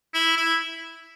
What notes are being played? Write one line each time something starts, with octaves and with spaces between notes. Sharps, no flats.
E4
E4